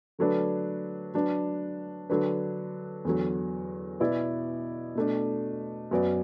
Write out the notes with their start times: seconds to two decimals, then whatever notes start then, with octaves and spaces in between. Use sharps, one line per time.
0.19 D3 F#3 A3 D4 B4
1.14 F#3 D4 B4
2.10 D3 F#3 D4 B4
3.05 E2 D3 F#3
4.00 B2 B3 E4 D5
4.95 B2 A3 D4
5.91 F#2 F#3 B3 F#4 D5